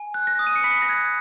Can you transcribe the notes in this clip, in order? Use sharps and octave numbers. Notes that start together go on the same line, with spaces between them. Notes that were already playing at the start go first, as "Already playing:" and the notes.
Already playing: G#5
F#6
A#6
D#6
D#7
C#7
B5 B6
A#6
F#6 G#6